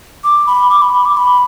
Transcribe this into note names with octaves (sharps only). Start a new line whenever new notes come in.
D6
B5
D6
B5
B5
D6
B5